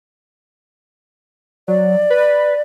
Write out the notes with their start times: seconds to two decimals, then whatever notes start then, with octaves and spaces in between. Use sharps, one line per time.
1.68 F#3 D5
2.10 B4